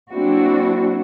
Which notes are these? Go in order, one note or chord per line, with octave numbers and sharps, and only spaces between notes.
F#3 A#3 C4 D4 E4 F#4